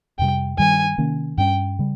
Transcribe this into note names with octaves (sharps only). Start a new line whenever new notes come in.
F2 C3 G3 G5
G2 D#3 G3 G#5
C3 D#3 A#3 C#4
G2 G3 C#4 G5
C#3 G3